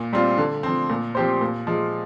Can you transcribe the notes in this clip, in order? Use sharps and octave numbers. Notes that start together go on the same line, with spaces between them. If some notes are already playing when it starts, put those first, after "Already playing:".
Already playing: A#2
G3 C4 F4
D3
F3 C4
A#2
F3 C4 G4 C5
A#2
F3 G#3